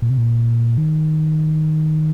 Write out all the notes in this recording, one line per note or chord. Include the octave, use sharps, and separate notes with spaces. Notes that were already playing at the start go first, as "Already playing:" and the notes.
A#2
C3
A#2
D#3